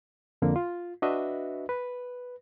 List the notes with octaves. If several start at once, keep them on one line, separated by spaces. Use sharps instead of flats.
F2 D3 A#3
F4
D4 F#4 B4 D#5 E5
B4